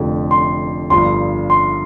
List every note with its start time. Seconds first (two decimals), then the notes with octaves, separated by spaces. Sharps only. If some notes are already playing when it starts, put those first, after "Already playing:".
Already playing: F1 F2 D3 F3
0.31 C6
0.90 G1 G2 F3 C6
1.50 C6